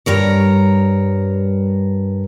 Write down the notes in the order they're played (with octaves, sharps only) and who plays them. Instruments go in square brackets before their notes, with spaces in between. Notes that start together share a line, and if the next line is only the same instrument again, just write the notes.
[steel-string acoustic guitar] G2 A#4 C#5